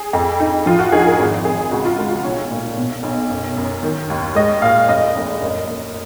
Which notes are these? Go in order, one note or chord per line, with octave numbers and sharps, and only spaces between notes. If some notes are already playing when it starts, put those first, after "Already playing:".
Already playing: G#4
F2
D#4
F3 F4
F#4
D#4 G#4
A#4
G#1
G#1 G#4
C#2 F#4
F4
G#3 F#4
F#4
B1 C#5
A#2
B2
B1
F#2
F#2
D#3
D#2
G#3 D#5
A#2 F5
F1 D#5
F1
F#2
A#3